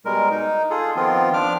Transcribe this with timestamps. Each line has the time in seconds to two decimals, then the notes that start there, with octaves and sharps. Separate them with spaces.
0.05 B2 G3 G#3 A#4
0.31 D#4
0.70 F4 G#4 A4
0.96 D#3 F3 B3 C4 F4
1.34 F3 D4 D6 F6